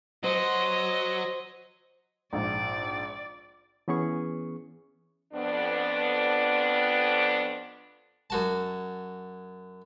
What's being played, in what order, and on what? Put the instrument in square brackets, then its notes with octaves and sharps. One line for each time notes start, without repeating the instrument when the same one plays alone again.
[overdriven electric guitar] F#3 [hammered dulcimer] C5 [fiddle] D#5
[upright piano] A#1 G#2 [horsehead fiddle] D5
[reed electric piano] E3 B3 C#4 G#4 C#6
[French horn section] F2 B3 D4
[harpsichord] F#2 F#4 A5